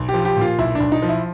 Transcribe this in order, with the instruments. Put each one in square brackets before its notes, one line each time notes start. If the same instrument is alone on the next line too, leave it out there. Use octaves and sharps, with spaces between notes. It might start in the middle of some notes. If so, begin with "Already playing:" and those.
Already playing: [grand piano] B1
G4
F3
G4
A#2 F4
B1 E4
D4
B1
D#4
F3
E4